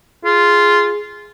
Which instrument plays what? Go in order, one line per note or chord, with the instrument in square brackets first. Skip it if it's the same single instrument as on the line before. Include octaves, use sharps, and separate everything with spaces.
[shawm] F4 [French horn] G#4